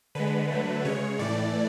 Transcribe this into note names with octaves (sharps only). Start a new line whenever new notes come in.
D3 G#3 B4
D3 F#3 A3
C#3 G#3 C#5
A2 E3 A3 D5